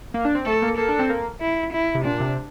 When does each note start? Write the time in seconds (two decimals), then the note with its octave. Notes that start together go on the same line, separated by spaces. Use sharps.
0.14 A#3
0.25 D4
0.35 C4
0.46 A3 A4
0.62 A#3
0.77 A#3 A4
0.88 D4
0.99 C4
1.09 A#3
1.41 E4
1.73 E4
1.95 C3
2.05 A#2 D4
2.20 C3